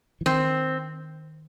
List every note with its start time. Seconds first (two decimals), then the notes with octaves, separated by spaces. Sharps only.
0.21 E3
0.26 D#3 C4